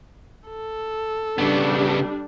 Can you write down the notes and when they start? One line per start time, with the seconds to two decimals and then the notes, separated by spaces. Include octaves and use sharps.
0.49 A4
1.38 C#3 G3 B3 D4